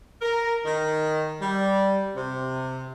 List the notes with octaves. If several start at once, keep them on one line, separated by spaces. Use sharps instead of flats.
A#4
D#3
G3
C3